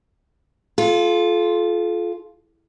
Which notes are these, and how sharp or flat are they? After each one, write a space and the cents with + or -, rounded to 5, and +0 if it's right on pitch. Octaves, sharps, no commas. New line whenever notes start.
F4 +0 A4 -35